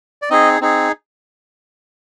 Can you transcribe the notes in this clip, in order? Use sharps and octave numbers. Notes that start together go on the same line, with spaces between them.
D5
C4 D#4 G#4 D#5
C4 D#4 G#4